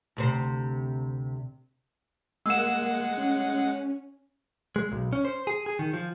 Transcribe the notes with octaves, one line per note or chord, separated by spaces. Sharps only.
D2 C3 C5
G#3 A#3 F#5 E6 E7
C#4
G#3
B1
C#4
C5
G#4
G#4
D#3
F3